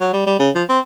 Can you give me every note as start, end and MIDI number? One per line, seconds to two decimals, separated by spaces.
0.01 0.12 54
0.13 0.25 55
0.26 0.35 55
0.39 0.51 49
0.55 0.64 53
0.69 0.79 60